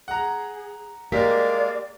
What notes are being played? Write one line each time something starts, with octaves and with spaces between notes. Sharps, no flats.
G#4 F#5 A#5
G#3 A#3 G4 A#4 D5 F5 B6